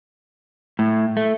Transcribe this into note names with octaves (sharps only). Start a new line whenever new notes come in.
A2
A3